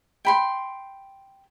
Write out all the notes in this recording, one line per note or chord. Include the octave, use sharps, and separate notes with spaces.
G5 B5 C6